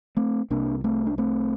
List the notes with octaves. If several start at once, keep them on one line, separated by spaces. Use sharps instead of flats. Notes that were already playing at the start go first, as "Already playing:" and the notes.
A3 C4
C2 C3 A#3 D4
A3 C4
D4
A3 C4